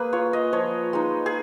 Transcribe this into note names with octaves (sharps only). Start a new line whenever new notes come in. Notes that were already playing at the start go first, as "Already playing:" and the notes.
Already playing: A#3 G#4 B4
F4 C#5
D#5
F3 C#5
G#3 D#4
G#4